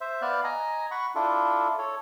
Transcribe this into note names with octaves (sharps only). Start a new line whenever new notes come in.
C5 E5
B3 D5 F5 F#6
D#5 G#5 A#5
F#5 B5 C#6
D4 E4 F4 A4
A4 C#5